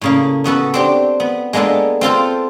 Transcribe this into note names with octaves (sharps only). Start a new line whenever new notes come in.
A2 C#3 A#3
C#3 B3 F#4 A4
C4 D4 G4
B3
G#3 A#3 B3 D4 A4
C4 F4 A4 C5